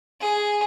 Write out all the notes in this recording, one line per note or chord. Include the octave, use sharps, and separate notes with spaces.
G#4